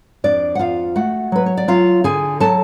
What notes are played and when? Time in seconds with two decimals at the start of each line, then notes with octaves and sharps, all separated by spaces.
0.24 F2 D4 D5
0.55 F#5
0.59 F2 F4 F5
0.96 A3 F#4 F#5
1.32 F#3 B4
1.46 C#5
1.57 D5
1.68 F#3 F4 F5
2.04 D3 G#4 G#5
2.40 F#3 A4 A5